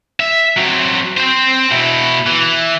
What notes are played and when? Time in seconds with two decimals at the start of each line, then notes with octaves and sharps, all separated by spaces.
0.20 E5
0.57 F#3 C4
1.17 C4 C5
1.71 B2 E4
2.27 E3